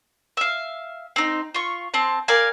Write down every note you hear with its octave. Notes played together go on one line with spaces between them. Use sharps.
E5 F5
C4 D#4
F4 C#6
C4 A5
A#4 D5 F5 G#5